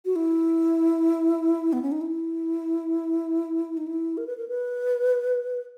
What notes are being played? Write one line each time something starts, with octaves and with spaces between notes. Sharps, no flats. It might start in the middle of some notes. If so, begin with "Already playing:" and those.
F#4
E4
B3
C#4
D#4
E4
D#4
E4
A#4
B4
A#4
B4